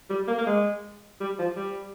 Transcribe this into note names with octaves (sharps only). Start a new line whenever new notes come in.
G3
A#3
A#3
G#3
G3
F3
G3